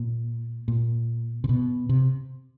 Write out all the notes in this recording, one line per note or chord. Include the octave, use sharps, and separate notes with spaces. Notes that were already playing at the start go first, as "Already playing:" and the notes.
Already playing: A#2
A#2
C3
B2
C3